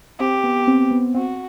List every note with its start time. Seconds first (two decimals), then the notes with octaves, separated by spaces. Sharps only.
0.20 C4 G4
0.44 B3
0.67 C4
0.91 B3
1.15 C4 F#4